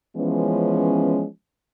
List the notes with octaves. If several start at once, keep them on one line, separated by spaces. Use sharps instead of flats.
E3 F3 G#3 B3 C#4